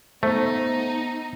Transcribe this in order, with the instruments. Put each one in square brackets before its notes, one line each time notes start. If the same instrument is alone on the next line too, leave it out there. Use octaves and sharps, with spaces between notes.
[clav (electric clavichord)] A3 [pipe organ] B3 [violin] D#4 [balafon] C5